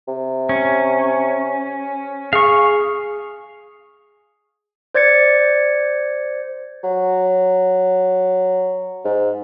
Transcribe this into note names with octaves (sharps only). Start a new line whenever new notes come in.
C3
C#4
G#4 F5 C#6
C5 D5 G#6 A6 C#7
F#3
G#2